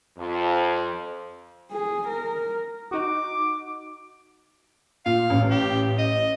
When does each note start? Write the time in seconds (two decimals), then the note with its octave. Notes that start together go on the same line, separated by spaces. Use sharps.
0.17 F2
1.71 G#4
2.08 A#4
2.91 D#4 F#4 D6
5.06 A#2 F5
5.30 A1
5.50 G4
5.99 D#5